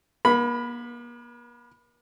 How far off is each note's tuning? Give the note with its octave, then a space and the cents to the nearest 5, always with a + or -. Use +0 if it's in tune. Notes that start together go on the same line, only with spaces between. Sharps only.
A#3 +45 B5 +0